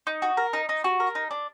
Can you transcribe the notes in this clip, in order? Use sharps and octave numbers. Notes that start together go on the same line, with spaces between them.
D#4
F#4
A#4
D#4
D#4
F#4
A#4
D#4
D4